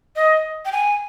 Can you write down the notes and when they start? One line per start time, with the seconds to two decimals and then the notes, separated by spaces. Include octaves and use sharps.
0.16 D#5
0.65 G5
0.72 G#5